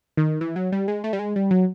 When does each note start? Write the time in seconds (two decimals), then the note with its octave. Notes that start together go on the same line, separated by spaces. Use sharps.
0.17 D#3
0.41 E3
0.56 F#3
0.72 G3
0.88 G#3
1.04 A3
1.13 G3
1.19 G#3
1.36 G3
1.51 F#3